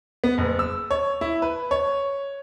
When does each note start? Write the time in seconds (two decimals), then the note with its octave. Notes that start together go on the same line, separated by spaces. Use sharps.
0.24 B3
0.38 F#1
0.59 E6
0.91 C#5
1.21 E4
1.42 B4
1.71 C#5